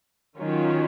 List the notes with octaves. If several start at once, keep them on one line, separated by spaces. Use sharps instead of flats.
D#3 F#3 C#4 F4